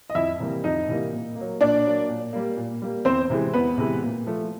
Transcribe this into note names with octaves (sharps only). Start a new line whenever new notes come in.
D#5
F2 E4 E5
C3 E3 G3 A#3
F2 D#4 D#5
C3 E3 G3 A#3
A#2
A#3
F#3
A#2 D4 D5
F#3 A#3
A#2
G3 A#3
A#2
G3 A#3
E2 C4 C5
C3 E3 G#3
E2 B3 B4
C3 E3 G#3
A#2
F3 A3